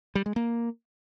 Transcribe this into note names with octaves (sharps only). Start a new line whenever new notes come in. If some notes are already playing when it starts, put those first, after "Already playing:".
G3
G#3
A#3